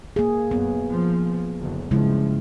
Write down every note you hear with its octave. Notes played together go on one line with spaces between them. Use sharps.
A#3 G#4
F#2 B3
F3
F#1 D2
G2 C#3 F3 G#3 E4